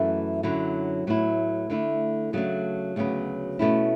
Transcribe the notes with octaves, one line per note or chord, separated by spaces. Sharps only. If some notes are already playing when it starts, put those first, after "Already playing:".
Already playing: F#2 E3 A3 E4
F#2 D3 F#3 C#4 E4
A2 F#3 B3 E4
D3 A3 E4
C#3 F#3 A3 D4
D2 C#3 F#3 B3
B2 A3 C#4 E4